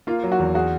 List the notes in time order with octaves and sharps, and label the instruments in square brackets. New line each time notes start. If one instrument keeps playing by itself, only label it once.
[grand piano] A#3 [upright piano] F4
[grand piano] F#3
[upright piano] F#4
[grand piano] E2
[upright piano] F#4 [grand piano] G#4